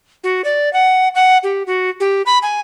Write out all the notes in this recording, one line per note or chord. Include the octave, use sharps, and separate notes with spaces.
F#4
D5
F#5
F#5
G4
F#4
G4
B5
G#5